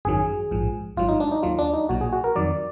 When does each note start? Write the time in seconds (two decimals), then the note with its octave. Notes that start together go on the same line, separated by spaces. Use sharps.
0.05 G#1 F#2 D#3 F#3 G#4
0.51 A#1 G#2 F3
0.97 G#1 G#2 F#3 F4
1.09 D#4
1.20 D4
1.31 D#4
1.43 D#2 D#3 F#3 F4
1.59 D4
1.74 D#4
1.89 B1 A#2 F#3 F#4
2.01 G#4
2.13 F#4
2.24 A#4
2.36 F2 D#3 F#3 D5